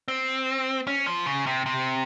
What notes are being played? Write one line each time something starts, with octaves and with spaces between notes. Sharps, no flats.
C4
C#4
F3
C#3
C3
C3